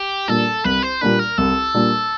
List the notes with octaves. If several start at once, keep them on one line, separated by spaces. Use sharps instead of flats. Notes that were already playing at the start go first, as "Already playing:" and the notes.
Already playing: G4
A#2 G3 A#3 D4 A4
C2 B4
C5
A#2 G3 A#3 D4 B4
A#4
C2 A4
A#2 G3 A#3 D4